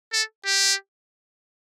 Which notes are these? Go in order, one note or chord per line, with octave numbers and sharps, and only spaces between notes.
A4
G4